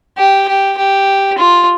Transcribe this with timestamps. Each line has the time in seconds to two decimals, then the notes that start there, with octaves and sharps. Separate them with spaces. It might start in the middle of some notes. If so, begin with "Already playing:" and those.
0.17 G4
0.48 G4
0.78 G4
1.38 F4